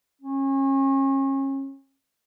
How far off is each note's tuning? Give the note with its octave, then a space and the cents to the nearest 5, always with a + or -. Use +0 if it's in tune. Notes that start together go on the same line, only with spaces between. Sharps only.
C#4 -35